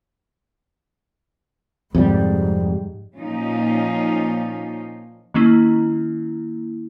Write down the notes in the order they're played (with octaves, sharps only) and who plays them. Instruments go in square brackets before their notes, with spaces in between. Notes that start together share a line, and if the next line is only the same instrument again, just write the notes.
[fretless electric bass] F2 C3 G3 [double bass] G#2
[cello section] A#2 F3 C#4 D#4 F4
[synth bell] D#3 A#3 C#4 E4